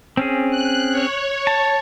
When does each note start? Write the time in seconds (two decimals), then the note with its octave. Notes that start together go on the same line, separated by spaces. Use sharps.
0.17 C4 C#4 G#4
0.51 F#6
0.91 C#5
1.47 A5